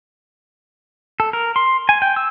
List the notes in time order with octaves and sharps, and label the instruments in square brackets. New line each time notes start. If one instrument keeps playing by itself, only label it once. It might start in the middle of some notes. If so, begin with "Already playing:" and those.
[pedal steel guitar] A4
A#4
C6
G#5
G5
E6